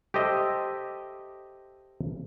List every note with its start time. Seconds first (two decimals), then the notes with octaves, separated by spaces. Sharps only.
0.14 G4 A4 C5 D#5 E5